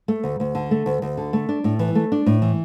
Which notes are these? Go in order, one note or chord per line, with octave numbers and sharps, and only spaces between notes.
A3
D2
D2
D3
A3
D2
D2
D3
A3
D4
A2
E3
A3
D4
A2
E3